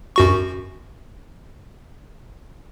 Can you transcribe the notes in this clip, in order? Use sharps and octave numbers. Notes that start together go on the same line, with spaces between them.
F#2 F#4 C#6